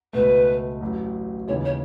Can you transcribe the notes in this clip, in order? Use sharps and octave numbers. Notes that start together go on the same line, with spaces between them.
C#2 B2 A3 B4
A1 A2 F#3
D#2 C#3 E3 G#3 C#5
C#5